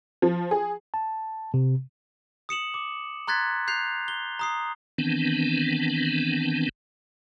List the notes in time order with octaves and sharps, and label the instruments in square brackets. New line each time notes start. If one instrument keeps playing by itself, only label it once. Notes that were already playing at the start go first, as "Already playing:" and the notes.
[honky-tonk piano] F3
G#4
[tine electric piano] A5
C3
[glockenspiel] D#6 C#7 E7 F#7
D6
A#5 C6 F#6 G#6 A6 B6
F#6 G6 C7 F7
G7
A#5 D#6 C7
[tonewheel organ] D#3 E3 B3 C4 D4